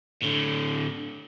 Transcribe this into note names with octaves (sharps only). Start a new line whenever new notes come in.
A2 D3